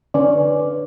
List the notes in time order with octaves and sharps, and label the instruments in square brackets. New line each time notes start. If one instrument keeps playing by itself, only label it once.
[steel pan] D3 C#4 [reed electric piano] B4 D5